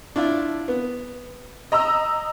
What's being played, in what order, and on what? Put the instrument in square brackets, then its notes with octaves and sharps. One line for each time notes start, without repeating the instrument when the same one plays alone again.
[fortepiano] D4 E4 F4
B3
[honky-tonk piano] D#5 A#5 E6